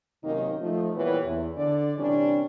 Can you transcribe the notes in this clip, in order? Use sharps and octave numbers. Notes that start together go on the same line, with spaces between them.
F#2 C3 D#3 A#3 C#4 D#4
F3 A3 D#4
A#2 E3 G3 B3 C#5
E2
D3 D5
C3 E3 G3 C#4 D4